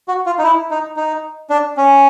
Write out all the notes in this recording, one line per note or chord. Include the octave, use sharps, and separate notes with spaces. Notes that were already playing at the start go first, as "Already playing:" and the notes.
F#4
F4
D#4
E4
D#4
D#4
D4
C#4